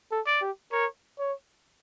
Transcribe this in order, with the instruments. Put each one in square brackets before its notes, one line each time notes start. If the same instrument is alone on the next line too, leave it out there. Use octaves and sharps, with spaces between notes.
[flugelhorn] A4
[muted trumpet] D5
[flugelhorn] G4
[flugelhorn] A#4 [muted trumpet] C#5
[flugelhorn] C#5